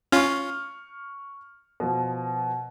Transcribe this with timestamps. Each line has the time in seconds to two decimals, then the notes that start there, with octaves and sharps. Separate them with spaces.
0.12 C#4 F4 C#6 F6
1.80 B2 F3